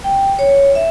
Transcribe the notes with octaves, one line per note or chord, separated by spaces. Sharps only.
G5
C#5
E5